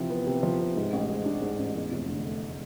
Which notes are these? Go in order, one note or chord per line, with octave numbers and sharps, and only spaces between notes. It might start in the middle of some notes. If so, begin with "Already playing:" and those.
Already playing: C3 E3 F3
B3
C3
F3
C3
G#2
A1
G#3
D4
G#2
A1
E2
F1
D3
A3